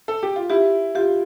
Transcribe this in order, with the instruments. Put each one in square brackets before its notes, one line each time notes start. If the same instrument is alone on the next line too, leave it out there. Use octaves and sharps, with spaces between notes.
[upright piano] A4
G4
F4
[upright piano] E4 [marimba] G4
[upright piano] F4 [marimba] G4